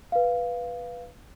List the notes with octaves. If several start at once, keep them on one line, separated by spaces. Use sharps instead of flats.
B4 F5